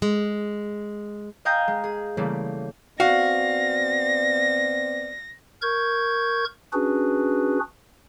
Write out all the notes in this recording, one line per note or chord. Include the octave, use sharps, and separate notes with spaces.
G#3
D#5 F5 G5 G#5 A#5 G6
G#3
G#4
C#3 E3 G3 A3 A#3
B3 C4 F#4 D5 F5 A#6
A#4 C#6 G6 G#6
C#4 D4 F#4 G#4 B4